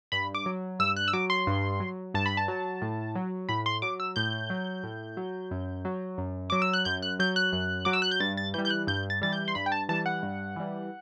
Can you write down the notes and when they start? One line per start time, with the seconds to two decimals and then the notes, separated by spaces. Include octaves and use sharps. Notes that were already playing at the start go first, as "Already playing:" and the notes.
0.12 G2 B5
0.35 D6
0.46 F#3
0.79 G2 E6
0.97 F#6
1.08 E6
1.13 F#3 D6
1.30 C6
1.47 G2
1.80 F#3
2.14 G2 A5
2.26 B5
2.37 A5
2.48 F#3
2.82 A2
3.16 F#3
3.49 A2 B5
3.66 C6
3.82 F#3 D6
4.00 E6
4.16 A2 G6
4.50 F#3
4.83 A2
5.17 F#3
5.51 F#2
5.85 F#3
6.18 F#2
6.50 F#3 D6
6.62 E6
6.73 F#6
6.85 F#2 G6
7.03 F#6
7.19 F#3 G6
7.36 F#6
7.53 F#2
7.85 F#3 D6
7.93 E6
8.02 F#6
8.11 G6
8.20 G2 A6
8.37 A6
8.54 E3 G3 G6
8.65 G6
8.70 F#6
8.87 G2 G6
9.10 A6
9.22 E3 G3 A6
9.33 G6
9.48 C6
9.55 G2 B5
9.66 G5
9.72 A5
9.89 E3 G3 A5
10.06 F#5
10.23 G2
10.56 E3 G3